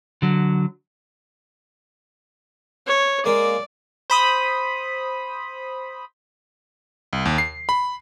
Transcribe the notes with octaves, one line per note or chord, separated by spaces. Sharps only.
D3 F#3
C#5
G#3 A#3 D5
C5 B5 D#6
C2
D#2
C7
B5